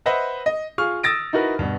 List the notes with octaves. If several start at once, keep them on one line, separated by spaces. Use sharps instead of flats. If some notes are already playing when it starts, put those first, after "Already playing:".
B4 C5 D#5 E5 F#5 B5
D#5
F4 G#4 C#6 F6
D#6 E6 A6 A#6 D7
D#4 E4 F#4 A#4 B4
G2 B2